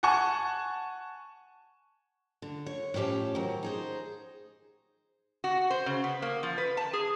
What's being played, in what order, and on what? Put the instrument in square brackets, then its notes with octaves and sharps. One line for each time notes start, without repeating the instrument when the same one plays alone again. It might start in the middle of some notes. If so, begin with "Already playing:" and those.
[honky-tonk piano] F#5 G#5 A5 C#6
[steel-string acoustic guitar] D3
C#5
A2 F3 C#4 G4 A5
D#3 F#3
D#4 G#4 C5
[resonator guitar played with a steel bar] F#4
C5
C#3
B3
A#3
F3
B4
A5
G#4